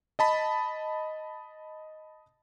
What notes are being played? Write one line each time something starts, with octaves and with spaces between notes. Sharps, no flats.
D#5 A5 B5